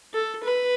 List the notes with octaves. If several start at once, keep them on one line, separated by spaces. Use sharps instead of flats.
A4
B4